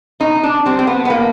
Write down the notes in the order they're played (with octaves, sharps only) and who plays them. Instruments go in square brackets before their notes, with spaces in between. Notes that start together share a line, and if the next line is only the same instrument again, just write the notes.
[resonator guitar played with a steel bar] B2 D#4
D4
G3 C4
C4
B3
B3
A2 A#3